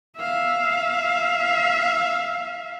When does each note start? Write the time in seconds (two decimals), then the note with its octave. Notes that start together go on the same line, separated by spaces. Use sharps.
0.18 E5 F5